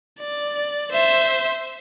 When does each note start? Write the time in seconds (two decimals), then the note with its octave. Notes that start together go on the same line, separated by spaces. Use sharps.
0.20 D5
0.92 C5 E5